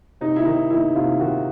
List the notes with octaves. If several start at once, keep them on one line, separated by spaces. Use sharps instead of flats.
C3 D#4
E4
D#3 D#4
D#3 E4
C3 F4
D#3 F#4